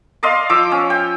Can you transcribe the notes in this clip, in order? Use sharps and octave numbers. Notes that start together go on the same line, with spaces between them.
D5 D#5 F5 C6
F3 D6 E6
C#4
G5